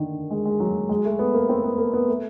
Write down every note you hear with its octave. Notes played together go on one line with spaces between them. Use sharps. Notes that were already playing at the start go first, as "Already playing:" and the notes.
Already playing: D3 D#3
G#3
G#3
F#3
G#3
A3
B3
A#3
C4
B3
A#3
B3
A3